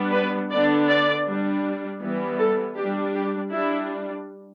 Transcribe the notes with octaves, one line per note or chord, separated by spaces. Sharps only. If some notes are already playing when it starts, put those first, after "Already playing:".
Already playing: G3 B3 D4
B4
D3 B3 D4 D5
D5
G3 D4
E3 G3 B3
A4
G3 D4 G4
G4
G3 D4 E4